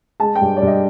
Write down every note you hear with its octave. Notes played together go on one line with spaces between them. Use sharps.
G#3 A5
G5
G2
D5
G2
D#5